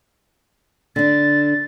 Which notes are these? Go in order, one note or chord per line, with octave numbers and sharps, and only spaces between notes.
D3 D4 A6